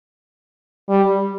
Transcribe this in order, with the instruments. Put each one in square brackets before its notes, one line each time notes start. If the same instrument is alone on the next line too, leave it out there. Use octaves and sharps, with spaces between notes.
[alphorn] G3